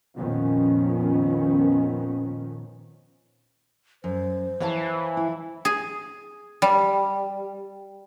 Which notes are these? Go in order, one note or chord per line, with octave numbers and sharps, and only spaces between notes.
F2 A#2 D#3 F3 B3 C#4
F#2 C5
E3 C#5 F5 A5
E4
G#4
G3